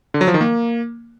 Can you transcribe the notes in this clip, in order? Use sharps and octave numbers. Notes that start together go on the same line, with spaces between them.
D3
F#3
F3
D#3
A#3